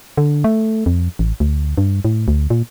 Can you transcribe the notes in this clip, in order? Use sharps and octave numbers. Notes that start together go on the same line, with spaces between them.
D3
A3
F2
A1
D2
G2
A2
D2
A#2